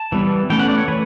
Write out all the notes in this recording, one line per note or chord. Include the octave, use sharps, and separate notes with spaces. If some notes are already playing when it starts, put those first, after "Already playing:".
Already playing: A5
E3 G3 B3
E3 A3 C#4 G5
F#5
D5
C#5
E3 A3 B4